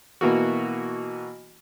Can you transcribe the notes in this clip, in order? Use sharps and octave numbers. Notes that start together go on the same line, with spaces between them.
B2 E3 A#3 F#4